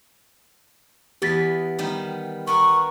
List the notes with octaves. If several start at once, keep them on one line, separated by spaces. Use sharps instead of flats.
E2 B3 G4 A6 B6
D#3 G3 B3
B3 A#4 F#5 C#6